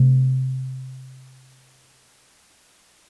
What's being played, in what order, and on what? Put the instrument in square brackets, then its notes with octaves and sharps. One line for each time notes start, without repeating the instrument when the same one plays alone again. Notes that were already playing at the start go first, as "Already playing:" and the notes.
Already playing: [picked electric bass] C3 A3